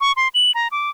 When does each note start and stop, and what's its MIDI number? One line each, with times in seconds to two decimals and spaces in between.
0.01 0.12 85
0.16 0.28 84
0.35 0.51 102
0.55 0.68 82
0.72 0.90 86